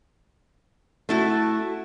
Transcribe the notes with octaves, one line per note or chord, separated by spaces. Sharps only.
A3 E4 F#4